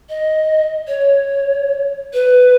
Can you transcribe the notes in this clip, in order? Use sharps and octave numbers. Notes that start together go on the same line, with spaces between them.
D#5
C#5
B4